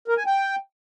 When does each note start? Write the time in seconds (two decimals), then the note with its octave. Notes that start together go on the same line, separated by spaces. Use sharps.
0.08 A#4
0.17 G#5
0.26 G5